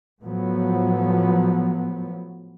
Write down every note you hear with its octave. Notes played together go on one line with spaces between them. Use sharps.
A2 F3 F#3 B3